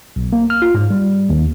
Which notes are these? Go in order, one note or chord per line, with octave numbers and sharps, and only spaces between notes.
B1
A#3
F6
F4
G#2
G3
D#2